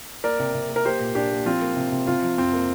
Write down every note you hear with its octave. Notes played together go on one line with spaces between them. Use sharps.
A#3 A#4 D5
C3
C3
A#3
A#4
A#3 G4 C5
A#2
A#2 D4 G4
A#3
F3 C4 F4
A#3
C3
C3
C3 C4 F4
F3
F2 C4
A#3